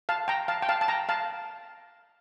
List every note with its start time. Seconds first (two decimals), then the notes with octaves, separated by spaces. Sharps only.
0.09 F5 A5
0.28 G5 A#5
0.48 F5 A5
0.62 G5
0.69 F5 A5
0.81 A5
0.88 G5 A#5
1.09 F5 A5